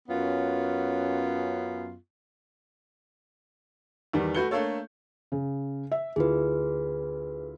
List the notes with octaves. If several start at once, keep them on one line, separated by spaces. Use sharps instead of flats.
F#2 B3 C#4 F4
E2 D#3 G3
A3 F#4 B4 G6 C#7 G7
A3 A#3 D4 A4 C#5
C#3
E5
D2 E4 F4 G#4 B4